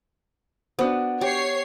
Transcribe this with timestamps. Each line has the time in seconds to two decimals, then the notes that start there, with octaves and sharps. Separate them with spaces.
0.79 B3 D4 F#4 C5
1.21 G4 C#5 C7